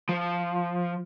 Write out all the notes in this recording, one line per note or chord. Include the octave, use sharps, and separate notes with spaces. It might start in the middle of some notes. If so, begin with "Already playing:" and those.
F3